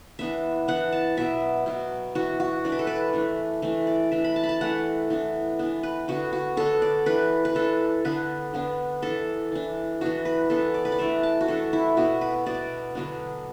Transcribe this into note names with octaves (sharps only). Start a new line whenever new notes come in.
E3 B3 D4 E5
E3 B3 D4 F#5
A5
B2 F#3 B3 E5
B2 F#3 B3
E3 D4 F#4
F#4
E3 D4 D5
B4
A4
B4
E3 A3 D4
E3 A3 D4
D5
E3 A3 D4 E5
B5
A5
B5
A5
E3 A3 D4 F#5
E3 B3 D4
E3 B3 D4
B4
D3 B3 D4 F#4
F#4
D3 B3 D4 A4
D5
E3 D4 B4
B4
E3 D4 A4
D3 B3 D4 B4
D3 B3 D4
E3 D4 A4
E3 D4
E3 B3 D4 F#4
B4
E3 B3 D4 A4
D5
B4
D5
E3 A3 D4 E5
A5
F#4
E3 A3 D4 A4
E4
B2 B3 D4 F#4
B4
B2 B3 D4 D5
D3 F#3 B3 D4